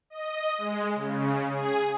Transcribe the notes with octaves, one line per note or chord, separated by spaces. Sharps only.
D#5
G#3
C#3
G#4